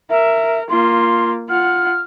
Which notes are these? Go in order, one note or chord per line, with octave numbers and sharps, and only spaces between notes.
A#4 E5
A#3 F4 C6
F4 F#5 F6